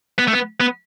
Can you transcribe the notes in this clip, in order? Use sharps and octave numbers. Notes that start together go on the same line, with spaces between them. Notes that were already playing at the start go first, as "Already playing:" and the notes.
B3
A3
B3
B3